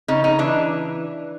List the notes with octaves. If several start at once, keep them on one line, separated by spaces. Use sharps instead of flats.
C#3 D#4
D#4
E3 D4